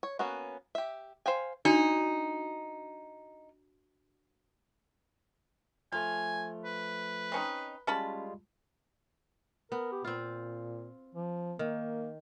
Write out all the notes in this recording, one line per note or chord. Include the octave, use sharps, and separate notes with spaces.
C#5
A#3 B3 C#4 F#4
G4 E5
C5 F5 G5 G#5
D4 D#4 F#4 D5
F3 A3 F4 G#5
B4
C4 C#4 D#4
G3 G#3 C#4 F4 A5 B5
B3 A#4
G4
A#2 C4 F4
F3
D#3 A#3